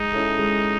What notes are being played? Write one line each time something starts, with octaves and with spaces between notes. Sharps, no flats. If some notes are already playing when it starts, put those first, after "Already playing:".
Already playing: G#3 D#4
C#4 E4 A4
G#3